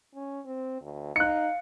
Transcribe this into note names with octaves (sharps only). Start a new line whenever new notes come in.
C#4
C4
D2
D#4 F5 F#6 C#7